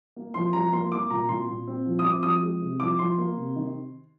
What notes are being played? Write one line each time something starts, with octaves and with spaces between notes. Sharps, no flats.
A#3
F3 C6
F3 A#5
A#3 C6
A#3 D6
A#2 A#5
A#2 C6
A#2
C4
F3
D#6
C4 D6
F3 D#6
G#3
C3
F3 D6
F3 C6
A#3
C3
D#3